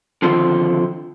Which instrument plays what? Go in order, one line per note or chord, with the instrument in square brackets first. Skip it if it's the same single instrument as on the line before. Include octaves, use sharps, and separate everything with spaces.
[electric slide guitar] D3 D#3 F3 C4 F4 A4